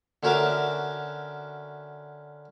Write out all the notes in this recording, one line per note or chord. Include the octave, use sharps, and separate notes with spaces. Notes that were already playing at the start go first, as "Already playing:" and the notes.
D3 C#4 F#4 A#4 E5 D6